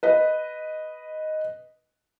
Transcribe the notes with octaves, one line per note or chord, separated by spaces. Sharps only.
B4 D#5